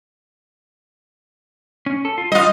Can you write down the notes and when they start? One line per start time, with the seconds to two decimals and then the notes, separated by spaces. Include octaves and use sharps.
1.86 C#4
2.05 A4
2.18 F4
2.32 G3 F4 D#5